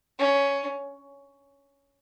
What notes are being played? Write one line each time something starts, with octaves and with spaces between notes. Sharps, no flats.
C#4